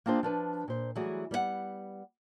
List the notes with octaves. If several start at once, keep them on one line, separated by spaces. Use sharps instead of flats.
A#3 C4 D4 F4 G#4 C5
F3 D4 B4
A#2 C5
E3 F#3 G3 A3 F#4 G#4
G3 B3 A4 F#5